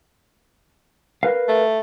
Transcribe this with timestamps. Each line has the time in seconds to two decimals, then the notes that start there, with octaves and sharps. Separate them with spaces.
1.23 A#4 B4 F5
1.48 A3